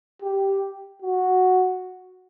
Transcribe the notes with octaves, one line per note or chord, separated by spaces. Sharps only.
G4
F#4